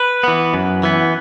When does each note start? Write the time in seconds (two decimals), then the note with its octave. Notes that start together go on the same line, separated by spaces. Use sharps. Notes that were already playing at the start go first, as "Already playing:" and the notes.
Already playing: B4
0.24 E3 B3
0.54 F#2
0.83 E3 B3